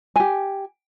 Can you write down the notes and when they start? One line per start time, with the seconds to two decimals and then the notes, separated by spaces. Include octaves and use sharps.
0.16 G4 G#5